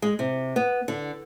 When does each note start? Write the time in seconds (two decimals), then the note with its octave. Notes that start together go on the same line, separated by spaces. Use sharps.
0.02 G#3
0.19 C3
0.56 B3
0.88 D3